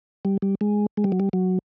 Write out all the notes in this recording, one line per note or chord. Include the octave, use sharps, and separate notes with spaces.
G3
G3
G#3
G#3
G3
F#3
G3
F#3